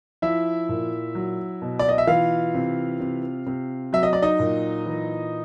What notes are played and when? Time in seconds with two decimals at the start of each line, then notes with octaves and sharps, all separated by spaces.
0.22 F3 E4 E5
0.69 A#2
1.15 F#3
1.62 B2
1.79 D5
1.89 D#5
1.98 E5
2.07 E3 F4 F5
2.55 C3
3.00 C3
3.47 C3
3.93 F#3 E5
4.03 D#5
4.13 D5
4.22 D#4 D#5
4.39 A#2
4.86 E3